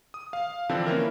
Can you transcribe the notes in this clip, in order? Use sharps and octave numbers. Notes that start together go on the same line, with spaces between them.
D#6
F5
D3 E3 F3 C4 D4
A#3 C#4 E4 A#4